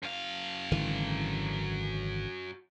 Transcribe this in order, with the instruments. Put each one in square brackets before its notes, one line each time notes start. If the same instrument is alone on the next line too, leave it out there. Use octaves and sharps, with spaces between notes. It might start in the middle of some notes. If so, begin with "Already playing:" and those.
[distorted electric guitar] F#2 F5
[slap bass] G#1 D3 E3